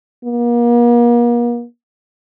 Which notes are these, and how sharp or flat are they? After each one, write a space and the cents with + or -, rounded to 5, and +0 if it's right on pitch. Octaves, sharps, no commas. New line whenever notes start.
A#3 +40